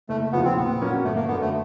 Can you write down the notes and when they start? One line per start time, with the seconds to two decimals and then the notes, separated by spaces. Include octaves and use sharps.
0.09 F#1 A3
0.32 E2 C#3 F3 B3
0.45 C4
0.57 A#1 B3
0.81 A#2 F#3 A#3 C#4
1.04 G1 A3
1.16 A#3
1.28 F#2 D3 B3
1.41 A3